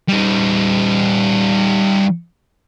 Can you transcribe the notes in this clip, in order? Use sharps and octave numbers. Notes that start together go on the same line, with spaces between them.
G3 D#4